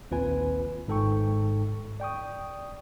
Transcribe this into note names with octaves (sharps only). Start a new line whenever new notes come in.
A#1 D#2 C4 F4 B4 G#5
G#1 G#2 A4 G5 C#6
D5 G5 C#6 D#6